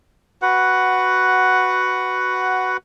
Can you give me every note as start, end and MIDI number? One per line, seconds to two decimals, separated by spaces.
0.42 2.77 66
0.42 2.77 71
0.42 2.77 78